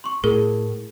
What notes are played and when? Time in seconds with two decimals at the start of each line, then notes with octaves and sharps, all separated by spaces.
0.04 C6 C#6
0.24 A2 G#4 A#4